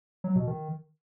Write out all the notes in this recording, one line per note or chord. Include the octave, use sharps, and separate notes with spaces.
F#3
B2
D#3